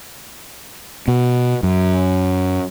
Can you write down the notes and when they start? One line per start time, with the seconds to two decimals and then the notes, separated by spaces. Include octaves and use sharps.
1.08 B2
1.63 F#2